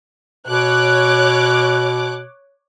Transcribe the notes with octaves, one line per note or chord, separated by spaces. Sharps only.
B2 C#5 D6 F#6